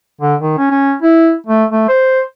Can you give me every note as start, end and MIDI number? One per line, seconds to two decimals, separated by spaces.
0.21 0.35 50
0.41 0.57 51
0.58 0.69 61
0.71 0.93 61
1.02 1.34 64
1.46 1.65 57
1.71 1.86 57
1.89 2.21 72